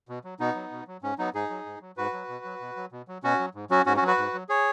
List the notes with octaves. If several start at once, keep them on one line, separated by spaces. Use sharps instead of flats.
B2
F#3
B2 B3 D#4
F#3
B2
F#3
G#2 C#4
F#3 B3 D#4
G#2 D#4 G#4
F#3
G#2
F#3
G#2 F#4 B4
F#3
B2
F#3
B2
F#3
B2
F#3
B2 C#4 F#4
F#3
G#2
F#3 C#4 F#4
G#2 C#4 F#4
C#4 F#4
F#3
F#4 B4
G#2
F#3
G#4 C#5